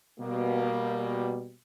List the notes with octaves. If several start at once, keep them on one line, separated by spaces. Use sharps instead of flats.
B2 G3 A#3